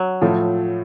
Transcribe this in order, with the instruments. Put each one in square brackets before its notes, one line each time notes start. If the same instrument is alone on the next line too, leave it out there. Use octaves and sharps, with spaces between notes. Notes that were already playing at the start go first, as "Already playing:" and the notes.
Already playing: [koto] F#3
[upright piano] A2 F3 A3